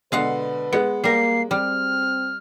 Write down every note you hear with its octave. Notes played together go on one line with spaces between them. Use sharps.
B2 D3 G#3 B4 F5 F#5
G#3 B3 C#7
G3 A#3 A#4 C7
G3 C4 F6